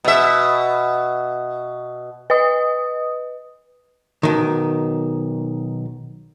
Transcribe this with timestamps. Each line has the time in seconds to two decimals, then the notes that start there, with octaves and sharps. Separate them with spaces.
0.04 B2 E5
2.30 B4 D#5 D#6
4.23 B1 D#3